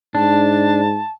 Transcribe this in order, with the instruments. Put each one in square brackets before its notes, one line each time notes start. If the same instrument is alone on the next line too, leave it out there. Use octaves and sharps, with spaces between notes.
[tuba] G#2 [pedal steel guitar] D4 [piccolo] A5